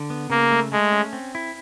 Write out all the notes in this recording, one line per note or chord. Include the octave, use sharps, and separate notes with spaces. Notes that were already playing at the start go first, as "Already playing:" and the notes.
Already playing: D3
B3
C#3 A#3
A3
G#3 A3
C#4
C4
E4